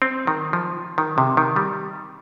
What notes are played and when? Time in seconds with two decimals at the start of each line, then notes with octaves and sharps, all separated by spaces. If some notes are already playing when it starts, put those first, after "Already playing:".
0.02 C4
0.27 D#3
0.53 F3
0.98 D#3
1.18 C3
1.37 D#3
1.56 G3